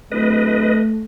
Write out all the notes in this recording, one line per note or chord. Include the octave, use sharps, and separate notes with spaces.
D1 A3 B4 D#5